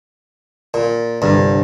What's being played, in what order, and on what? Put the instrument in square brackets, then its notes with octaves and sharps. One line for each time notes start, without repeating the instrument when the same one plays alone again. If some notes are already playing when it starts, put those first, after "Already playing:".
[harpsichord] A#2
[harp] G1 C2 [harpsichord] G2